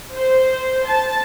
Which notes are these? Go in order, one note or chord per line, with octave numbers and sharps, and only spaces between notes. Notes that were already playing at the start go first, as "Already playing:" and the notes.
C5
A5